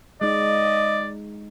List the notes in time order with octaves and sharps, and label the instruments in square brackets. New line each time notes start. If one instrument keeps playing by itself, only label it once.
[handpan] G#3 D#4 [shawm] D5 [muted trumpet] D#5